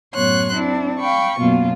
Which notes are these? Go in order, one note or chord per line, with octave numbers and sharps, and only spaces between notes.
F#2 A2 B3 C#5 C6 F#6
C4 D4 E4
F5 G5 B5 C#6
F#2 B2 A#3 B3 F4